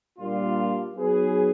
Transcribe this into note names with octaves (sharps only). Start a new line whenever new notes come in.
A#2 G3 A#3 D4 F4
F#3 B3 D#4 G#4 B4